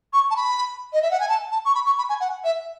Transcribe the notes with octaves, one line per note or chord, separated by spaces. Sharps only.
C#6
A5
B5
D#5
E5
F#5
G#5
A5
A5
C#6
B5
C#6
B5
G#5
F#5
E5